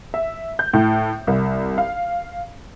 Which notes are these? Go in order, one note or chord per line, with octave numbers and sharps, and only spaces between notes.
E5
G6
A2
C2
F5